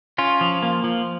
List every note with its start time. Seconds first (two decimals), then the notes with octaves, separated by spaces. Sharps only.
0.18 C#4 F4
0.41 F3
0.62 A#3
0.84 F3